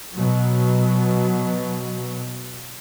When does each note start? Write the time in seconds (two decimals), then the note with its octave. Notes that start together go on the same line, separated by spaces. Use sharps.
0.14 B2 F#3